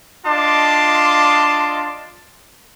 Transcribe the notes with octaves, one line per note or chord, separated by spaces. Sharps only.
D4 F4 D#5 A5 C6 D6